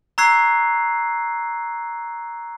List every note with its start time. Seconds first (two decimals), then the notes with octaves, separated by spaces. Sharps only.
0.18 A#5 C#6 E6 F#6 G#6 C7